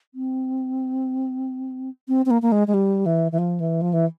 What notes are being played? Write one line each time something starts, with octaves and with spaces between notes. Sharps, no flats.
C4
C4
C4
A#3
A#3
G#3
G#3
G3
E3
E3
F3
E3
F3
E3